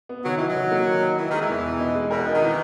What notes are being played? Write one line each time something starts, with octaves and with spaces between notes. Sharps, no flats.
B3
D#3 F#3
E3 D#4
F#3
D#3
A#3
D#3
D#4
E3 D#4
D#3 G#3
E3
E2
B2
D#4
G#3
B2 A#4
D#4
D#3
E3